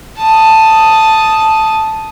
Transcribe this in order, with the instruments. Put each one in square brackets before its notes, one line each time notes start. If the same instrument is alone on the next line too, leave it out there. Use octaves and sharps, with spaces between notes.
[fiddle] A5 D#6